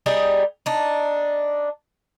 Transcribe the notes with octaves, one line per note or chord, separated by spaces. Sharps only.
G3 D#4 G4 G#4
D4 D#4